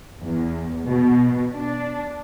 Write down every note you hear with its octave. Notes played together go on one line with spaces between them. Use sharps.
E2
B2
D4